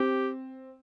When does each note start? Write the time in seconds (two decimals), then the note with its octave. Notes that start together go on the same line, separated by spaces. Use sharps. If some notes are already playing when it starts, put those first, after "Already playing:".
Already playing: C4 G4